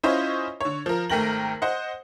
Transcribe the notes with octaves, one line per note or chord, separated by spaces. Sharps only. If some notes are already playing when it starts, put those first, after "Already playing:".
C#4 E4 F4 C5 C#5 D#5
D3 C#5
F3 A#4
G#1 A3 A#4 G5 A#6 F#7
C5 D#5 F#5